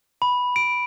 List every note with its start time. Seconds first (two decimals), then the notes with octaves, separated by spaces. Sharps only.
0.22 B5
0.56 D7